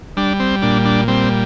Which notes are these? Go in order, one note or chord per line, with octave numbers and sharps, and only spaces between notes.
G3 D4
C4
A#2 D4
D4
G3 C4